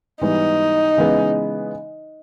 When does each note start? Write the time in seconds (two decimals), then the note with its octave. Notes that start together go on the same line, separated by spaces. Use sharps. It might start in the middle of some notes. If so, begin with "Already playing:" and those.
0.22 G#2 E3 G3 B3 D#4
0.97 C#3 E3 G#3 B3